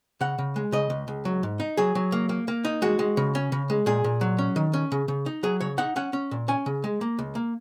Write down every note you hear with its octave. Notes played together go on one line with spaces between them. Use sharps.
C#3 F#5
C#3
G#3
C#3 D#5
C#2
C#2
F#3
G#2
D#4
F#3 G#4
F#3
A#3
A#3
A#3
D#4
G#3 F#4
G#3
C#3
C#4
C#3
G#3
A#2 G#4
A#2
F#3
C#4
D#3
C#4
C#3
C#3
D#4
F#3 G#4
C#3 C#5
D#4 F#5
C#4 F#5
C#4
A#2
C#4 G#5
C#3
G#3
A#3
C#2
A#3